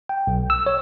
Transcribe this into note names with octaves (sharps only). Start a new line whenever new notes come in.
G5
B1
E6
C#5